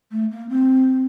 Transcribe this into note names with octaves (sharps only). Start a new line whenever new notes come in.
A3
A#3
C4